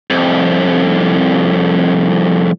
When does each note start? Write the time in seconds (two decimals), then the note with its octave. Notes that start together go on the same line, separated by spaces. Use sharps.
0.10 C2 F2